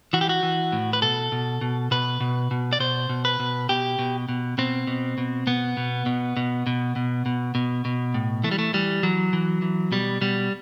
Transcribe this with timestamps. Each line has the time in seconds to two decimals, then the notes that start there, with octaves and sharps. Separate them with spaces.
0.13 E3 F#4
0.21 G4
0.29 F#4
0.43 E3
0.72 A2
0.93 B4
1.02 B2 A4
1.32 B2
1.61 B2
1.91 B2 B4
2.20 B2
2.51 B2
2.73 D5
2.80 B2 C5
3.09 B2
3.25 B4
3.40 B2
3.69 B2 G4
3.99 B2
4.29 B2
4.58 B2 C4
4.87 B2
5.18 B2
5.47 B2 B3
5.77 B2
6.06 B2
6.37 B2
6.67 B2
6.96 B2
7.26 B2
7.55 B2
7.85 B2
8.14 A2
8.44 E3 A3
8.51 G3
8.58 A3
8.73 E3 G3
9.03 E3 F#3
9.33 E3
9.62 E3
9.92 B2 G3
10.21 B2 G3